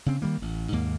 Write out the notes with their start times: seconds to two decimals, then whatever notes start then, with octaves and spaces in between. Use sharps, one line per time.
0.06 C#3 C4
0.22 D#3 G3 A#3
0.42 A1
0.72 D#2 G#2 A#3